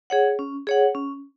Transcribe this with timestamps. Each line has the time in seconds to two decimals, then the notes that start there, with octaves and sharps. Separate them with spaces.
0.10 G#4 C#5 F#5
0.39 C#4
0.67 G#4 C#5 F#5
0.95 C#4